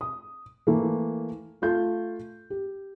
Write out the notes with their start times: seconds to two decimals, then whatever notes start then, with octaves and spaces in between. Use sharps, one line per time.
0.01 D#6
0.67 E3 A3 A#3
1.62 A3 F4 G6
2.50 G4